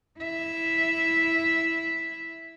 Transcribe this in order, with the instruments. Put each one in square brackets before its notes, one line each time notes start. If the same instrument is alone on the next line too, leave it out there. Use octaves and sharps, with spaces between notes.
[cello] E4 E5